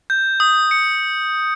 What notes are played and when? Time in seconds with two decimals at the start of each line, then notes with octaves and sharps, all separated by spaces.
0.10 G6
0.40 D#6
0.71 C#7